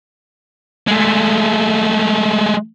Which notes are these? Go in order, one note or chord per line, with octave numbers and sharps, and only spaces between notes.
G#3 A3